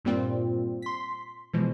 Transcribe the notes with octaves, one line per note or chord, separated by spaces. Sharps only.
G2 A#2 G3 A#3 C4 F4
C6 B6
B2 E3 F3 G#3